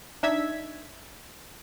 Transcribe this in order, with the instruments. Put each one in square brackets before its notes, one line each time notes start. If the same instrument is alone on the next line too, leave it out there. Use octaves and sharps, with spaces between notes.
[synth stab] D4 D#4 E5 E6 G#6 B6